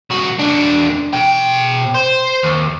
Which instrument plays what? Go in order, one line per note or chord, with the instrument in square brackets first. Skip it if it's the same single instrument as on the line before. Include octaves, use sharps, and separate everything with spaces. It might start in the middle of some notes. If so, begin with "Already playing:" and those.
[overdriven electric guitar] C2 F#4
E2 D4
B2 G5
C5
D#2